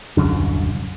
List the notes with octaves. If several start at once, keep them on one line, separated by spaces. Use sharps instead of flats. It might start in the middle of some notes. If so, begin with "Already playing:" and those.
D#1 C2 F#2 D3